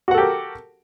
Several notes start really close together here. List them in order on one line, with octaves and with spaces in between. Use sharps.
F#4 F#5 A4 G4 A#4